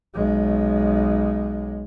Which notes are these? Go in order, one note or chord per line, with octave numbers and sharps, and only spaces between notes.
B1 G#3